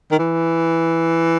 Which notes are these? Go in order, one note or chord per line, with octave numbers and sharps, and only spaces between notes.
D#3
E3